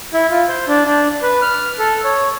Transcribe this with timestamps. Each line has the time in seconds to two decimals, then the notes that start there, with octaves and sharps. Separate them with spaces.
0.14 E4
0.31 F4
0.48 C5
0.68 D4
0.85 D4
1.22 B4
1.42 F6
1.79 A4
2.04 C#5